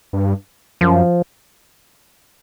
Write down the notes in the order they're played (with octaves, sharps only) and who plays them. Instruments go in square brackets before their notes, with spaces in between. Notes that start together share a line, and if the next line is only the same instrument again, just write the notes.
[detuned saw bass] G2
[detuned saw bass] F#2 [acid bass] F3